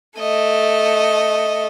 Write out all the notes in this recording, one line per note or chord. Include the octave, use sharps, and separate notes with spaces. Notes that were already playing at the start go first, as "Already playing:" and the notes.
A3 D#5